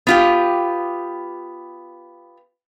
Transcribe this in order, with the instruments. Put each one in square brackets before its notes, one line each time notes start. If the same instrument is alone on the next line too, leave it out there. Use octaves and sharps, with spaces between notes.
[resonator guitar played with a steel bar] B3 F4 G4